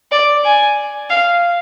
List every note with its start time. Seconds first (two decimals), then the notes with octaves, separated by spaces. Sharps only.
0.12 D5
0.45 G#5
1.10 F5